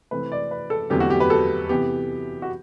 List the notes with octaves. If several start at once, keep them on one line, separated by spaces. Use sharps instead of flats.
C3 E3 A3 C4 B4
D5
B4
A4
E2 D3 F#3 A3 C4 G4
F#4
G4
B4
A4
C3 E3 B3 G4
F#4